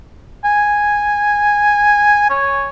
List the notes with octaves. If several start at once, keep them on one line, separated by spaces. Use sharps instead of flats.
G#5
C#5